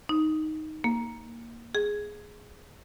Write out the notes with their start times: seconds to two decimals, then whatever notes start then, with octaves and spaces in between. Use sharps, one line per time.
0.09 D#4
0.84 A#3
1.75 G#4